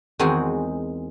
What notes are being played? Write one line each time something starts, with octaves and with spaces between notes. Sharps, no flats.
E2 D#3 G#3 C4 F#4 G#4